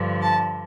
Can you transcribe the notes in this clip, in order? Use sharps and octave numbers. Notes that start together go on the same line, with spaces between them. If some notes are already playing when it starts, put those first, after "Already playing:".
Already playing: G2 D3 F3
A5